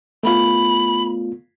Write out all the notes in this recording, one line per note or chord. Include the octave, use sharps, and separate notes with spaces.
A3 B3 F4 B5